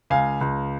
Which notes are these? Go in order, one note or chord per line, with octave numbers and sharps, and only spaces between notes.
C#2 F5 G#5
C#2